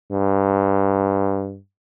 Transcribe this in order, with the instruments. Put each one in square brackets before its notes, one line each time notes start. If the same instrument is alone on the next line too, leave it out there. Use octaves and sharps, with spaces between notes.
[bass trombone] G2